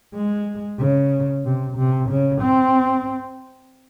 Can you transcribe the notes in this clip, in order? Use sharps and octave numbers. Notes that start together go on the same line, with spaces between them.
G#3
C#3
C3
C3
C#3
C4